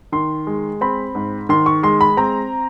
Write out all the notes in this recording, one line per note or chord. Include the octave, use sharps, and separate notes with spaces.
D#3 C6
G#3
C4 B5
G#2
D#3 C6
C#6
G#3 C6
B5
C4 A#5